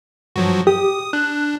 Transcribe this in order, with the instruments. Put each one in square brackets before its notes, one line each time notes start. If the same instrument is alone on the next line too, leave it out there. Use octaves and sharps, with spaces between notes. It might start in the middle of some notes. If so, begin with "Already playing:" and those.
[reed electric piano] G2 [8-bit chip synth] F3 F#3 F#4
[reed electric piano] G4 [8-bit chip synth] D#6
[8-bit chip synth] D4 [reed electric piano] F#6